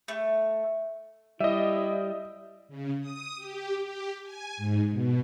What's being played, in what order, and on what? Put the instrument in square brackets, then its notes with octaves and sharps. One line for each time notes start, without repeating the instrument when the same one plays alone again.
[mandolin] A3
[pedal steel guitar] G3 [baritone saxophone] E4 [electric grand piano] D#5 E5
[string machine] C#3
D#6
G4
G4
G#5
G#2
B2